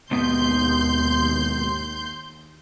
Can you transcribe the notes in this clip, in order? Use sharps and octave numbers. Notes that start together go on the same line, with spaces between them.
D#2 G#2 B2 B3 C6 G6